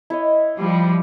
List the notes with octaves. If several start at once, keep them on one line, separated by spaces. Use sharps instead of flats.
E4 C#5 D#5
F3 G3